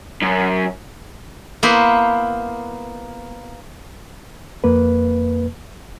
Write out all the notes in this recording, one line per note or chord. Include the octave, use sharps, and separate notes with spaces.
F#2
A#3 B3 E4 B4 C5
F2 A#3 B4